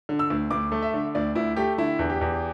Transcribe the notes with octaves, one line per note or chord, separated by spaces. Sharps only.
D3
E6
D2
D2 D6
A3
E5
D3
D2 D5
D2 E4
A3 G4
D3 E4
E2
G4
E2